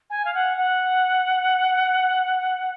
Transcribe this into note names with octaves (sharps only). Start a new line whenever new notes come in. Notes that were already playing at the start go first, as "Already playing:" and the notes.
G#5
F5
F#5
F#5